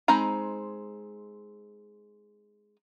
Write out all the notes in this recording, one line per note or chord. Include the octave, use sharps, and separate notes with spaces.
G#3 C4 D#4 A#5 B5